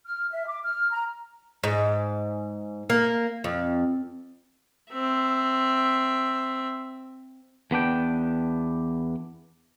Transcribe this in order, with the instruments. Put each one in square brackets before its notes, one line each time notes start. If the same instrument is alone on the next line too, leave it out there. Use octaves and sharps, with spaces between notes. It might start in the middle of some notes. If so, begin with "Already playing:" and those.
[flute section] F6
E5
D6
F6
A#5
[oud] G#2
A#3
F2
[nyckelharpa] C4 E5
[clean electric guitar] E2 B3 D4 G5